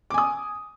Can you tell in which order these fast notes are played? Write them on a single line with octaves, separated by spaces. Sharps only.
D6 G#5 D#6